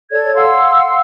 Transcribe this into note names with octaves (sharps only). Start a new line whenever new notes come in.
A4 C#5 D5 G#6
F5 F#5 C6 E6